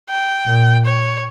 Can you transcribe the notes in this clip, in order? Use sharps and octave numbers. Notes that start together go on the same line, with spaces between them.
G5
A#2
C#5